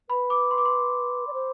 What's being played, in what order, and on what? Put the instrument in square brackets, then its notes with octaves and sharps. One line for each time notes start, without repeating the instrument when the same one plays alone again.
[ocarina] B4 [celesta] B5
[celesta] D6
C6
D6
C6
[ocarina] D5
C5